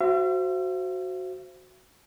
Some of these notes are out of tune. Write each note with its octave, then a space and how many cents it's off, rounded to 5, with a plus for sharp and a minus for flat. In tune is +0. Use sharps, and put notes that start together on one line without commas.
F#4 +0 C5 +0 E5 +45